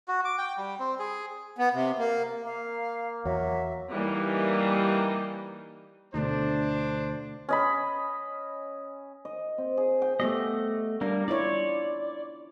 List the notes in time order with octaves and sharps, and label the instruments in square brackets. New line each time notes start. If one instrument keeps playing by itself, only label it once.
[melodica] F#4
D6
G5
G3
C4
G#4
[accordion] B3
C3
A#3
[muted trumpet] A#3 [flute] F5
[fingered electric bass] E2 [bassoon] F#3 [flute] E5
[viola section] E3 G3 A#3 D#4
[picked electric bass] D2 [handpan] B2 D3 A3 [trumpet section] D4 C5
[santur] C#4 D#5 B5
[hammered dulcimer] D#5
C4
G#4
G5
[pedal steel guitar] A3 D#5 [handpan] B3 G4
[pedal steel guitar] G3 A#3 A#4 [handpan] D4
[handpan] E4 F4 C#5 [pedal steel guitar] D5